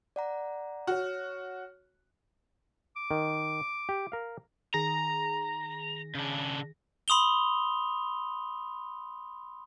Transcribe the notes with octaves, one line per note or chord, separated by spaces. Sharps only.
D5 F#5 A#5
F#4 C#5 F6
D6
D#3
G4
A#4 F5
D#3 G#4 A#5 A#6
C#3 D4
B5 C6 D#6 F7 G7